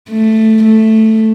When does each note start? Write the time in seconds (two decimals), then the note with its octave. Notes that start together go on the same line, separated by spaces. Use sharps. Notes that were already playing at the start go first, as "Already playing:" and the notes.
0.10 A3
0.63 A3